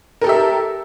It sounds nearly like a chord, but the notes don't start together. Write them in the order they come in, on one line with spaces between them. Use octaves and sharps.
A#4 A4 G4 E5